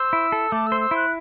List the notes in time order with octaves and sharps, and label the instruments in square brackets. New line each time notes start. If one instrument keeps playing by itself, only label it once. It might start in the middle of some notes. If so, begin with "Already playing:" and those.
Already playing: [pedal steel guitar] C5 [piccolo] E6
[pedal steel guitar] E4
A4
[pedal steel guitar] A3 [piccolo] D6
[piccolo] E6
[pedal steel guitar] C5
[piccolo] E6
[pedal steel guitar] E4
[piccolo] F#6